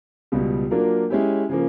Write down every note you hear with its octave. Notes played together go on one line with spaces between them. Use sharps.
C#2 B2 G3
F#3 A#3 D4 F4 A#4
G#3 C#4 E4 G4
C#3 F3 A#3